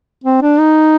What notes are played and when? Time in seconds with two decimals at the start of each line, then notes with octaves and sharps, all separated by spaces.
0.24 C4
0.42 D4
0.60 D#4